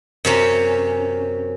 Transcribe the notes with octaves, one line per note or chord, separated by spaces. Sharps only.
F#2 C3 C#4